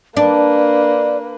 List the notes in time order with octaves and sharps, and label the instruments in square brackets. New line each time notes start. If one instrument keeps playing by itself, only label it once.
[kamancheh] A#3 B4 [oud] D4 [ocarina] D5